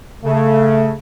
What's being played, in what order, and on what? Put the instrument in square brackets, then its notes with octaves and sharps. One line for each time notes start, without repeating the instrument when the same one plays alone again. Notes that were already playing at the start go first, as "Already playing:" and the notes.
[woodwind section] C#3 [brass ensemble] A3